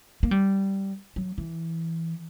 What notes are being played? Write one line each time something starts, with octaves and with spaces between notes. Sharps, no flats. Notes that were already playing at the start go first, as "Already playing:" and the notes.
A#3
G3
F#3
E3